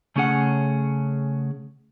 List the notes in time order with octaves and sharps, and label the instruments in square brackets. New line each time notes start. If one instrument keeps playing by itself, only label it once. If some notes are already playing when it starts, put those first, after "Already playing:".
[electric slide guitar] C#3 A3 C#4 G#4 D5 F#5